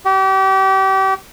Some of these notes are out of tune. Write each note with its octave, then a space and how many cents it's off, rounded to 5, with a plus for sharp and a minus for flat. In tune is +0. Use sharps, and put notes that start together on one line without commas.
G4 -35